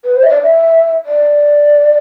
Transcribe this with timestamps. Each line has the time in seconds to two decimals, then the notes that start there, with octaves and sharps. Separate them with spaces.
0.04 B4
0.16 C5
0.23 E5
0.29 D5
0.42 E5
1.06 D5